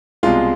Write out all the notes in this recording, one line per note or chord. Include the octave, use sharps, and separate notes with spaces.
C2 B2 G#3 F4